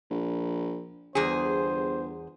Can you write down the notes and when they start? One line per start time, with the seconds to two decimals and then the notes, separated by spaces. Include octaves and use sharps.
0.10 A#1
1.15 G1 E2 G#4 C5